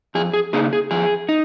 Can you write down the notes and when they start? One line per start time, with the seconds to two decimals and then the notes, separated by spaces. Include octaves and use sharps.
0.15 F2 G#4
0.33 G#4
0.53 C#3 A#3 D#4 G#4
0.73 G#4
0.91 F2 G#4
1.29 D#4